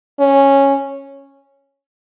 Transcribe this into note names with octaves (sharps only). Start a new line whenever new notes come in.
C#4